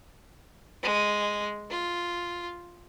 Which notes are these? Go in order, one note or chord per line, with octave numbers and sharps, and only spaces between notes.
G#3
F4